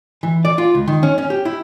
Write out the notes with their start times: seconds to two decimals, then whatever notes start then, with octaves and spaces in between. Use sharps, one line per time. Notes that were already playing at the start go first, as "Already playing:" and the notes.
0.23 E3
0.45 D5
0.58 F4
0.75 C#2
0.88 D#3
1.03 C#4
1.18 C#4
1.30 G4
1.45 E4